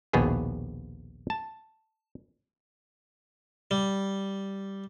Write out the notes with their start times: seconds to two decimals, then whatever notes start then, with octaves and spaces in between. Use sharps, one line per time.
0.13 A#1 D#2 B2 B3 G#4
1.30 A5
3.71 G3